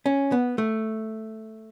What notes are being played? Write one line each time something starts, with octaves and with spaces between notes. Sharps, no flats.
C#4
B3
A3